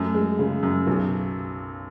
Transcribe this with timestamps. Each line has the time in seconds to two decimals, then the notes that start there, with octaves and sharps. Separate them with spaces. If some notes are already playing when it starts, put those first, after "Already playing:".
Already playing: F#2 A3
0.14 G#3
0.39 C#3
0.63 F#2
0.87 B1